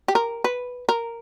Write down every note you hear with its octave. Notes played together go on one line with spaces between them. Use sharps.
G4
A#4
B4
A#4